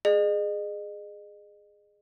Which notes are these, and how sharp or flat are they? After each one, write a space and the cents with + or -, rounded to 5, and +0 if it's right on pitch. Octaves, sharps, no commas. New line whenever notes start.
G#4 +0 D#5 -40